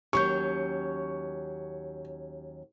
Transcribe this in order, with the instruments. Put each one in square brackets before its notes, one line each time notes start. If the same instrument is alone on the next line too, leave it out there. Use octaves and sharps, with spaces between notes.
[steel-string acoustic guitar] D#2 F#3 C#4 [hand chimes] G4 G6 [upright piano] C#6